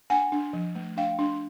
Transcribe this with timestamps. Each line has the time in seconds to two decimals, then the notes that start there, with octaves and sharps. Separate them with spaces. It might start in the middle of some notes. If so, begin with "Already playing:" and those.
0.10 D4 F#5 G#5
0.32 D4
0.53 F3
0.75 A3
0.97 D4 F5 G5
1.19 D4